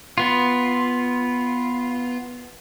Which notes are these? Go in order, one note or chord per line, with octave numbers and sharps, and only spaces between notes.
B3 F4